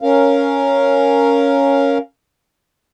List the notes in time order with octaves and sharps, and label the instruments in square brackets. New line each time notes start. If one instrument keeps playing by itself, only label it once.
[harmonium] C#4 A#4 F5